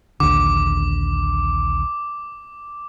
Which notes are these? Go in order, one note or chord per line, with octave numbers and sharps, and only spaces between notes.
A#1 D#2 D3 D6